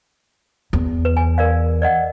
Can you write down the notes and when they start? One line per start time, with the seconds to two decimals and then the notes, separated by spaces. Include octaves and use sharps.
0.73 E2
1.05 B4
1.17 G#5
1.38 A#4 D5 F5
1.82 D5 D#5 F#5